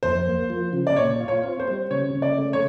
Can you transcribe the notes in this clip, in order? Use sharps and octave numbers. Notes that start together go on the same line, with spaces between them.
F2 C5
A#3
F3
C#3
D5
A#2 C#5
F4
C#5
C4
C5
G3
C#3 C#5
C#3
D5
A3
C#5